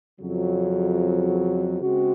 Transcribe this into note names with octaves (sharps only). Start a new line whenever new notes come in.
F2 C#3 F#3
C#3 G#3 C4 F#4